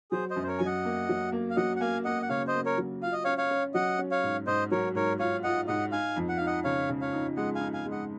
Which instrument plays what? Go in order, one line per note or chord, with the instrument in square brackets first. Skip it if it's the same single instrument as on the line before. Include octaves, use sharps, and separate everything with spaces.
[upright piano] F#3 [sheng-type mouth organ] G#4 C5
[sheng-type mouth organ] C5 D#5
[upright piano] F#2
[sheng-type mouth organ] C5
A#4 C#5
[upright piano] F#3 [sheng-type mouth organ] G#5
[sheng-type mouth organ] D#5 F#5
[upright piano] A#3
F#3
A#3
[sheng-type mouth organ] F5
[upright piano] F#3 [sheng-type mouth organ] D#5 F#5
[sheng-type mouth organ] F#5
[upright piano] A#3 [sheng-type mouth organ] F5 G#5
[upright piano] A#3 [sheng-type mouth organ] D#5 F#5
[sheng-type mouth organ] F#5
[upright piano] C#3 [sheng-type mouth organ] C#5 F5
[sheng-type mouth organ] C5 D#5
[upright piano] A#3
[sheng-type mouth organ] A#4 C#5
[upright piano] F#3
[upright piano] F4 [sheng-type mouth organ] F5
[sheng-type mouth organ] D#5
[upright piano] C#4 [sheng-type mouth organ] C#5 F5
[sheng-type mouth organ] C#5 F5
[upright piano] C#4
[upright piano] F#3 [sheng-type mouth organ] D#5 F#5
[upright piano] C#4
[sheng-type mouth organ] C#5 F5
[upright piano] G#2
[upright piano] G#2 [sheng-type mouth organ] C5 D#5
[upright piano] F#3 [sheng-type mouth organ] A#4 C#5
[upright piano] G#2 [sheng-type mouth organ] A#4 C#5
[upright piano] F4 [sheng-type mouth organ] C#5 F5
[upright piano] F4 [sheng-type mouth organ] D#5 F#5
[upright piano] G#2 [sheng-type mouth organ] D#5 F#5
[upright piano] D#4 [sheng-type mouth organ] F5 G#5
[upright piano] F2
[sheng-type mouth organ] F#5
[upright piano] D#4 [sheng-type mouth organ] F5
[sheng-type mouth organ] D#5 F#5
[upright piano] C#3 [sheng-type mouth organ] C#5 F5
[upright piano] C#3
[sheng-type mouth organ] C#5 F5
[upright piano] D#4
[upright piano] G#3 [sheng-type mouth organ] D#5 F#5
[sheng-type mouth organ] F5 G#5
[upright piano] D#4
[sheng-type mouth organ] F5 G#5
[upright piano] G#3
[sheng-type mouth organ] D#5 F#5